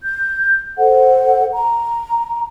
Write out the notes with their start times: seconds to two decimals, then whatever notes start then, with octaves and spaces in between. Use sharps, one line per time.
0.04 G6
0.78 A4 C5 F#5
1.53 A#5